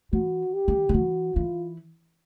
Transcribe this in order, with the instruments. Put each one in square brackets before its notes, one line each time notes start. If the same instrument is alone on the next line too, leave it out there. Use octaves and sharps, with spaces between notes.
[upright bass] E3 [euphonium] F#4
[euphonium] G4
[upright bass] D#3
D#3
[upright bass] E3 [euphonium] F#4
[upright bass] E3 [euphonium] F4